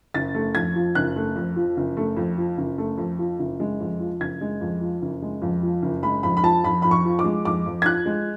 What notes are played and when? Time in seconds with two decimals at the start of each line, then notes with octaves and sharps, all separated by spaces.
0.14 F#1 A6
0.35 A3
0.55 F2 G#6
0.76 F3
0.95 F#1 F#6
1.16 A3
1.36 F2
1.56 F3
1.77 F#1
1.97 A3
2.17 F2
2.38 F3
2.58 F#1
2.78 A3
2.98 F2
3.19 F3
3.39 F#1
3.60 G#3
3.80 F2
4.00 F3
4.20 F#1 G#6
4.41 G#3
4.61 F2
4.81 F3
5.02 F#1
5.22 G#3
5.42 F2
5.63 F3
5.82 F#1
6.03 G#3 B5
6.23 F2 B5
6.37 B5
6.43 F3 A5
6.64 F2 B5
6.82 F2 B5
6.91 C#6
7.05 F3
7.19 D6
7.24 G#3
7.45 F2 D6
7.66 F2
7.82 G#6
7.86 F3 F#6
8.06 G#3